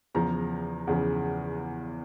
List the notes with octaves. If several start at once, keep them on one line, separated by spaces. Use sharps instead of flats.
E2 C#3 F3 A#5
E2 C#3 F3